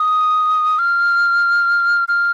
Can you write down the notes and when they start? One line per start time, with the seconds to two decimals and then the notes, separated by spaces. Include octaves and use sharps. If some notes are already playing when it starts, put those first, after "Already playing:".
Already playing: D#6
0.79 F6
2.08 F6